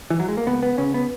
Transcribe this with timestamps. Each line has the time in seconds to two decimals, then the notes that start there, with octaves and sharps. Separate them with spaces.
0.10 E3
0.20 F#3
0.29 G#3
0.37 A#3
0.47 C#2 B3
0.63 B3
0.78 C#3 C#4
0.94 B3